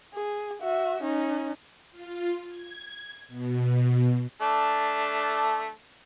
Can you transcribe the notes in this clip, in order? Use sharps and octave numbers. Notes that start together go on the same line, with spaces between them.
G#4
F#4 E5
C#4 D#4
F4
G#6
B2
A3 D4